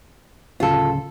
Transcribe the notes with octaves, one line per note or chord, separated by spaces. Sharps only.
D1 C#3 F4 A4